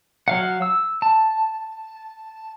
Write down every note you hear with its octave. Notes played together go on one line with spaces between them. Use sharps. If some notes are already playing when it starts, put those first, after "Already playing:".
F#3 F5 F#5
E6
A5